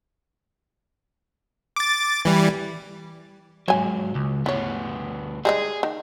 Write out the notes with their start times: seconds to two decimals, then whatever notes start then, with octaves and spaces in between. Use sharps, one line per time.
1.76 D6 A6
2.25 E3 G3
3.68 G#2 F#3 C#5 G#5
4.15 C#2
4.46 D2 E3 B3 C#5
5.45 G3 G#3 D#4 G#4
5.83 D#3